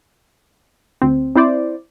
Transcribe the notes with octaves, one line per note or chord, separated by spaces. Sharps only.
D2 C4
C4 E4 C5 D5